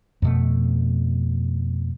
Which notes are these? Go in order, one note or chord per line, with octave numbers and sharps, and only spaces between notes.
F2 B2 A3